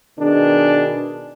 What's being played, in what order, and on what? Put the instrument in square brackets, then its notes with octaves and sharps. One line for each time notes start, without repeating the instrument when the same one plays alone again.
[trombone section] B2 D#3 D4 G#4